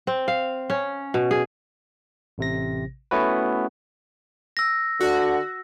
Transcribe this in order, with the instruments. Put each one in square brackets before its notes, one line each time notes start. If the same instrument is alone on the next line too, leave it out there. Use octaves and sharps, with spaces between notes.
[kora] C4
F5
C#4
B2
G#4
[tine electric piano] A1 C3 A#6
A3 B3 C#4 E4 F#4 B4
[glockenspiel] E6 A#6
[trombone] D3 [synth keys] F#4